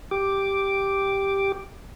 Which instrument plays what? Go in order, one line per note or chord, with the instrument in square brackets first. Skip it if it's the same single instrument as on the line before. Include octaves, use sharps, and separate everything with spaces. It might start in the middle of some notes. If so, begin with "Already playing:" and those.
[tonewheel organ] G4 D6